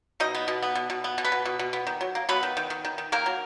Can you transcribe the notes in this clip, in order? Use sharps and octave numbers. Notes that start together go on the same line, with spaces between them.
B2 D#4 D#5
B3
B2
B3
B2
B2
B3
B2
B3 B4
B2
B2
B2
B3
D#3
F#3
A#3
F#3 B3 B4
D#3
D#3
D#3
D#3
D#3
D#3 A#3 A#4
F#3